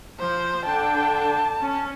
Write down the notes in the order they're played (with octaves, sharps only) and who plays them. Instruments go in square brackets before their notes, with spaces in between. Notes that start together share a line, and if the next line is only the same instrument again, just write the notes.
[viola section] F3 [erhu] C5
[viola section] D3 D4 G5 [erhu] A5
[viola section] C#4